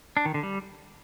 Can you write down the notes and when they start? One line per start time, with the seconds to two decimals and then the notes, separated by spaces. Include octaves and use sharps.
0.17 D4
0.25 D#3
0.34 D3
0.43 G3